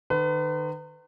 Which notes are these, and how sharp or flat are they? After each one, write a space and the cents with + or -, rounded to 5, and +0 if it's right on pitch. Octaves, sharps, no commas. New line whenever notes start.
D#3 -35 B4 +35